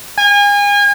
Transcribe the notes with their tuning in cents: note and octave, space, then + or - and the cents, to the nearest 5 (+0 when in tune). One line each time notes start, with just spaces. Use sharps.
G#5 -35